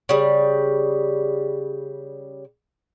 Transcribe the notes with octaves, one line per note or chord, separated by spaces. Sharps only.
C#3 G3